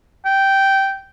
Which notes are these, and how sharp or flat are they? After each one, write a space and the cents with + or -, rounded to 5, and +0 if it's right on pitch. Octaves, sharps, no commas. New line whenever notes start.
G5 -10